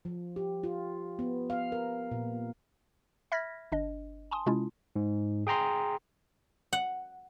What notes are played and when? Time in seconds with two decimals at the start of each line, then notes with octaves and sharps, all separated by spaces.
0.05 F3
0.36 G4
0.63 F4
1.19 B3
1.50 F5
1.72 A#4
2.11 A#2
3.32 E5 B5 F6 G#6 A#6 B6
3.72 G1 D4 D#5
4.31 G#5 A5 C6 D#6
4.46 C3 G#3 C#4 E4 F4
4.96 G#2
5.47 G#4 G5 A#5 C6
6.73 F#5